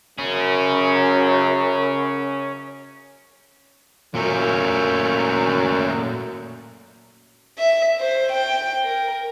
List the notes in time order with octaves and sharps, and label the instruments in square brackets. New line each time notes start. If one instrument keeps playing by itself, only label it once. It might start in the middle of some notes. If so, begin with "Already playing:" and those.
[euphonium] F#2 [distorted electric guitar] C#4 G#4
[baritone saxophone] F#2 [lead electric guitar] A#2 A3
[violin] E5
C5
G5
A#4